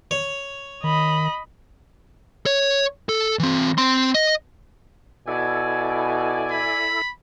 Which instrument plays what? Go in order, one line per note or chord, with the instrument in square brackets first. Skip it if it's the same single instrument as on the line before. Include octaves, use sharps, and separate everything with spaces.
[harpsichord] C#5
[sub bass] D#3 [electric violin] D#5 B5
[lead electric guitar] C#5
A4
E3 C4
C4 C6
D#5
[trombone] B2 [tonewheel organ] E4 A4 [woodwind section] D5 G#5
[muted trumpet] B5